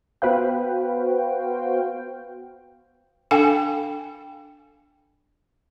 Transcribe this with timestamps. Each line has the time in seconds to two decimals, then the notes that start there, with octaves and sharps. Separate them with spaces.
0.22 B3 F#4 B4 C5 F5 G5
3.31 D4 A4 F5 G5 G#5